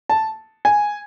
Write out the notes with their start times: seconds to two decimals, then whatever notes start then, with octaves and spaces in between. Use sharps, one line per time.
0.09 A5
0.65 G#5